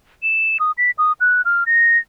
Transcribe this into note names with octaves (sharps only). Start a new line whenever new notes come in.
E7
D#6
B6
D#6
F#6
F6
A#6